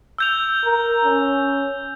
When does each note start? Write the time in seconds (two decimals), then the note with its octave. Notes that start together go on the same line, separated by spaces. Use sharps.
0.18 E6 G6 F7
0.65 A#4
1.05 C#4